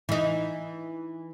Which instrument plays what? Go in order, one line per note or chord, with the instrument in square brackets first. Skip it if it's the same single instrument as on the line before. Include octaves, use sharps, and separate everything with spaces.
[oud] E3 D#4